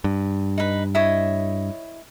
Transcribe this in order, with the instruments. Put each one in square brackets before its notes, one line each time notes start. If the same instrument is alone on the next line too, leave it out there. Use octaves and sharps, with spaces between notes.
[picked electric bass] G2
[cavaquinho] D#4 B4
E4 C#5 D#5